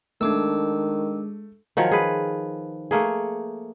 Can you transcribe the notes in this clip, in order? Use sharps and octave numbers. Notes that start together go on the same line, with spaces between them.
D#3 G#3 A3 D4 D6 E6
D#3 F3 F#3 C#5
G#4 B4
A3 A#3 G#4